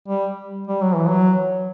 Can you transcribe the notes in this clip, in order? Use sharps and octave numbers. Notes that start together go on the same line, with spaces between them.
G3
G3
F#3
E3
F#3